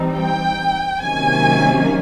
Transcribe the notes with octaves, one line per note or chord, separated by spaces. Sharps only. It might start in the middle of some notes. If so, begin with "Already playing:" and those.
Already playing: E3 G3 C4 D#4
G5
C3 D#3 F#3 A#3 C#4 G#5